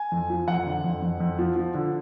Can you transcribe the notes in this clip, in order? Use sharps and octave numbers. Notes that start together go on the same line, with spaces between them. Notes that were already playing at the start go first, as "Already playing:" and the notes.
Already playing: G#5
F2
F3
F2 F#5
D3
F2
F2
F2
F3
F3
D3